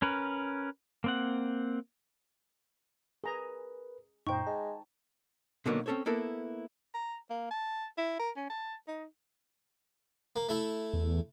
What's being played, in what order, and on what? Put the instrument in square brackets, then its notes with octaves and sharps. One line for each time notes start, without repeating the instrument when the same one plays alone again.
[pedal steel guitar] C#4 A#4 B4
A#3 C4 F#5
[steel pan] G#4 A#5 [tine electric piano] A#4 B4
[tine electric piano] F#2 A#2 [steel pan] D#4 C5 [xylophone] G5 C#6
[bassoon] G#3 [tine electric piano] A5
[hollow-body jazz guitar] B2 D3 D#3 F#3 A#3 B3
C4 C#4 A4 C5 C#5
A#3 B3 E4 A4 A#4
[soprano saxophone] A#5
A#3
A5
E4
A#4
C#4
A5
D#4
[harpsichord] A#3
A3 E4
[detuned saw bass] E2